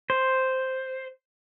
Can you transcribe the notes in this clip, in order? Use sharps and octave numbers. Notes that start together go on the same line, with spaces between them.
C5